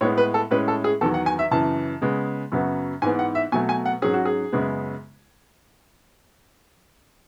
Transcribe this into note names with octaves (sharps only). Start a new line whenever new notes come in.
A2 G#3 B3 C#5
B4
A4
A2 G#3 C#4 B4
A4
G#4
E2 D#3 F#3 A4
F#5
G#5
E5
F#2 C#3 E3 A5
C#3 G#3 B3
F#2 C#3 F#3 B3
G#2 E3 B3 G#5
F#5
E5
B2 F#3 A3 G#5
G#5
F#5
G#2 F#3 C#4 G#4
F#4
G#4
F#2 C#3 G#3 B3